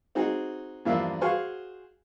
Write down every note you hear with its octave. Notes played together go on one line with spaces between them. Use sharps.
C4 D#4 F#4 G#4
E2 G2 F3 A#3 D4 E5
F#4 G#4 C5 F5 G#5 C#6